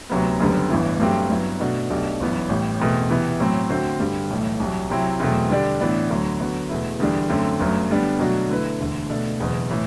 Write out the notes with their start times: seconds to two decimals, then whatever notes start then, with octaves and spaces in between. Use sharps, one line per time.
0.10 D2 C3 F#3 B3
0.40 F#1 F#2 D3 G3 B3
0.70 A1 G2 E3 B3 E4
0.99 G2 F#3 A3 C4 G4
1.30 G2 F#3 B3 E4
1.60 B2 A3 D4 F#4
1.90 B1 B2 A3 D4 G4
2.20 G1 F#2 E3 B3
2.49 A1 A2 G3
2.80 E2 B2 A3 C4
3.10 C3 E3 B3
3.40 A2 F#3 C4
3.70 D3 A3 C4 F#4 C5
4.00 G2 D3 G3
4.30 B1 A2 E3 A3
4.60 C2 C3 F#3
4.90 C3 F#3 C4 E4
5.19 E2 B2 F#3 A3 C4
5.50 D3 G3 D4 G4 D5
5.80 A2 E3 B3 D4
6.10 D2 D3 F#3
6.40 D3 F#3 B3 F#4
6.69 E1 E2 B2 A3 E4
7.00 E2 D3 G3 D4
7.30 F#2 D3 A3 C4
7.60 G1 F#2 F#3 A3
7.90 D3 G3 B3 D4
8.19 B2 F#3 A3 D4 F#4
8.50 D3 A3 E4 B4
8.80 E1 D2 D3 A3
9.10 B2 A3 D4 A4
9.40 F#1 E2 B2
9.70 A2 E3